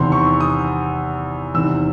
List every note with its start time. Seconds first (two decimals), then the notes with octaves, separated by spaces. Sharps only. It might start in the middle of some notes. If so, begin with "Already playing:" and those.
Already playing: E2 C3 D#3 C6
0.12 C#6
0.40 D#6
1.54 E2 C3 D#3 E6